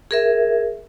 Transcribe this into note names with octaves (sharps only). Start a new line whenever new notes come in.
G#4 A#4 E5